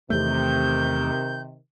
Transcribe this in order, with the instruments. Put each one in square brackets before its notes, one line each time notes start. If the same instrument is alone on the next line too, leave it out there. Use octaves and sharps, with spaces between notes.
[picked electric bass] E2 A3 [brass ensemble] C3 D#3 [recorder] G6